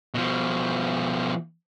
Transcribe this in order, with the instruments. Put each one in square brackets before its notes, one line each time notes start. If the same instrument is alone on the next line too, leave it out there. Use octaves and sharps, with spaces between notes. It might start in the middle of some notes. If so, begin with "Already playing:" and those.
[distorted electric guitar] B2 F3